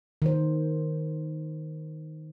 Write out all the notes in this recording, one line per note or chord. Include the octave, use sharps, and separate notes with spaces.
D#3 C5